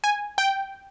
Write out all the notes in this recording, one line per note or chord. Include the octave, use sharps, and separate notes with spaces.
G#5
G5